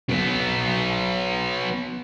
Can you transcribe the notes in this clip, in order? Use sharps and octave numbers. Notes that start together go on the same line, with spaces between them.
F#3 B3